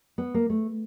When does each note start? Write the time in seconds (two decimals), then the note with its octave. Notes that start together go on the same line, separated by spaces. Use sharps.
0.18 B3
0.34 A#3
0.50 A3